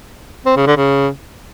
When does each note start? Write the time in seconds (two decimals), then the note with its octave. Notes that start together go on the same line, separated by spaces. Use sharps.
0.46 C4
0.56 C#3
0.67 D3
0.77 C#3